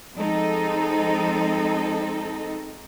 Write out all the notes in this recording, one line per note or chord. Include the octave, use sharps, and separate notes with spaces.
F3 G#3 C4 D#4 A4 D#5